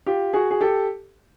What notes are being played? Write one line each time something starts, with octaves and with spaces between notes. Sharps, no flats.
F4 G4
F#4 G#4
G#4
G4 A4